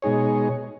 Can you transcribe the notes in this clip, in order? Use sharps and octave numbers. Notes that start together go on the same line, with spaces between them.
B2 G#3 D#4 G#4 C#5